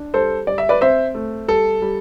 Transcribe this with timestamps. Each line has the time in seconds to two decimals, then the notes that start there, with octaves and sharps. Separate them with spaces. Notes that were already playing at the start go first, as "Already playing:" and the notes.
Already playing: D4
0.14 G3 A4 C5
0.47 G3 D5
0.58 E5
0.69 B4 D5
0.81 C4 C5 E5
1.14 A3
1.48 G3 A4
1.82 G3